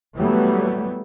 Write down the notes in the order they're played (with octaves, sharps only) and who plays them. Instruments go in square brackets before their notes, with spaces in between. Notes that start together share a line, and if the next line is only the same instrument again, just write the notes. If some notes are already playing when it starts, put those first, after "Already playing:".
[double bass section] E3 F#3 G3 A3 B3